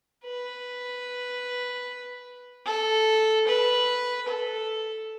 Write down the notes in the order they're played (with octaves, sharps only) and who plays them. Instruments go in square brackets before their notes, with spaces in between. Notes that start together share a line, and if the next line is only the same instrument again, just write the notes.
[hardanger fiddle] B4
A4
B4
A4